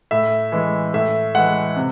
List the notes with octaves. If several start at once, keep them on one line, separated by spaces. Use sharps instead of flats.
A2 E5
E3 G#3
A2 E5
E3 G#3 F#5
C3